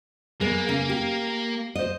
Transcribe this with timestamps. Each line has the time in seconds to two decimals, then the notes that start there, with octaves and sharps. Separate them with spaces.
0.41 G#3 A#3 B3
0.69 C#3
0.89 G4
1.75 C5 D#5